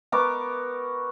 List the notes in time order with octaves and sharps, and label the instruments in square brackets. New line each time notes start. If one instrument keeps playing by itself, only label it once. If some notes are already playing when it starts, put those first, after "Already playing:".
[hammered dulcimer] B3 A#4 C#6 D6